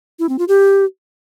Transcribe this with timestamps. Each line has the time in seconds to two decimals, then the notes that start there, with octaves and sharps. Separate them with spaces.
0.19 E4
0.29 C4
0.39 F4
0.48 G4